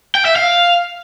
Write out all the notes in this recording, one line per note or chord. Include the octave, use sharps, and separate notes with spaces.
G5
E5
F5